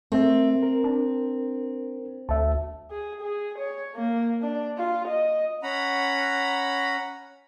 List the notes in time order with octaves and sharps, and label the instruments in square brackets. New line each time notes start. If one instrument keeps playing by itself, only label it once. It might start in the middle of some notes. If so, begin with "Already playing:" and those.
[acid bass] A3 [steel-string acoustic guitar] C4 [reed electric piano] A#4 E5
[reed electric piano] A#4
[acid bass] D4
[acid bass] D2 [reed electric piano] E5 A5
[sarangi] G#4
G#4
C#5
A#3
D4
F4
D#5
[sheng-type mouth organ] C#4 F#5 A#5 B5